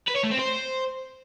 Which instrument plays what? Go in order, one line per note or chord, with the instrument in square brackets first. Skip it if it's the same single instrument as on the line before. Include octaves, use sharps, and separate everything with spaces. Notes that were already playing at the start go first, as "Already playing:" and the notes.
[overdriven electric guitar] B4
C#5
A3
C4
C5